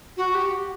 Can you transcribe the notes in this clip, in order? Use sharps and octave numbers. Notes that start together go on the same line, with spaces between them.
F#4
G4